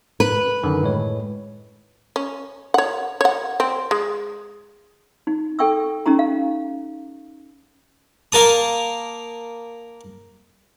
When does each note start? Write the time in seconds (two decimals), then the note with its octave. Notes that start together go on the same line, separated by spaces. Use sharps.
0.20 B4
0.63 F#2 D3 D#3
0.83 A2 G#3 C#5
2.16 C#4
2.74 C#5 F#5
3.21 C#5 F#5
3.60 C4
3.91 G#3
5.27 D#4
5.59 A4 G5 C#6 E6
6.06 C#4 D#4 G4 A#5
6.19 F5
8.32 A#3 A#4 A5 D#6